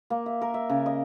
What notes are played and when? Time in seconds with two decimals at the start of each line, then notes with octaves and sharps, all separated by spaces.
0.10 A#3
0.26 E5
0.41 A#4
0.54 E5
0.69 C#3
0.86 D#5